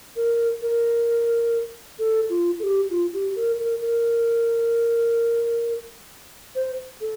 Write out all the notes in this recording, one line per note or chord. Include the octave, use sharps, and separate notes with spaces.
A#4
A#4
A4
F4
A4
G4
F4
G4
A#4
A#4
A#4
C5
A4